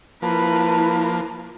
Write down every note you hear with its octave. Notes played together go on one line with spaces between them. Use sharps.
F3 A#3 E4 B4 A5